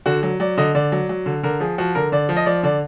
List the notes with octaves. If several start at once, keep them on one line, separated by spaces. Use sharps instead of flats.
D3 F#4
F#3
F#3 D5
D3 D#5
D3 D5
F#3
F#3
D3
D3 A#4
F3 G#4
F3 F#4
D3 A#4
D3 D5
F3
D#5
F3 D5
D3 D5